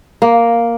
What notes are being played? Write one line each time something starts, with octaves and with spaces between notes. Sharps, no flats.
A#3